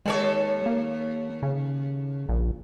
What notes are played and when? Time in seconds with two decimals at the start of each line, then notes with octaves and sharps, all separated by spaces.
0.06 D#2 G#3 A4 C#5
0.66 A#3
1.43 C#3
2.29 A#1